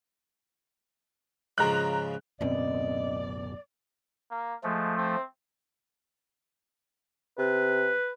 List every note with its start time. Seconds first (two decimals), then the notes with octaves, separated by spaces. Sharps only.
1.58 G#2 C#3 F3 A#5 F#6
2.41 D1 F#2 B2 C4 C#4 D5 D#5
4.31 A#3
4.63 F3 G#3 A3
4.97 C4
7.38 C3 B4